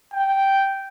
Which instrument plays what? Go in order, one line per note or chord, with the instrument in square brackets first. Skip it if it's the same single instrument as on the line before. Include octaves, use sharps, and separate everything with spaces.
[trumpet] G5